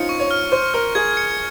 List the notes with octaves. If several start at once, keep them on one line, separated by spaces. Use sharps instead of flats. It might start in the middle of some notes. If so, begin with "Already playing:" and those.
Already playing: C4 C#4 D#4 F4 C#7
C#6
C#5
F6
C5 C#6
A#4 F6
G#4 G#6
C#7